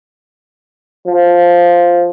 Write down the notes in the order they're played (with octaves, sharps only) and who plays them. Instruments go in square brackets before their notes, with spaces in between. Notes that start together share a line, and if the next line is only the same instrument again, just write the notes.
[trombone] F3